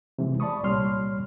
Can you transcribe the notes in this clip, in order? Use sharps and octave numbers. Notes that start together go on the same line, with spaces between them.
C3 E3 G#3
D5 A5 B5 C#6 D#6
C2 A#2 G3 C#5 C6 F6